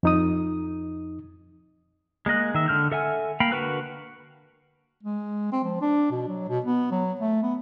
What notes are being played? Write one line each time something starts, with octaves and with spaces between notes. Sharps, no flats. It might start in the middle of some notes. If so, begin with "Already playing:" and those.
F2 D#4 D#6
G#3 A#3 D#5 F#6
D#3 E5
D3 F6 G6
A4 E5 F#5 G#5
A#3 F5 G5 B5
D3 F#4 A#4 B4 F#6
G#3
C4
F3
D4
B2
F#3
B2
B3
F#3
A3
B3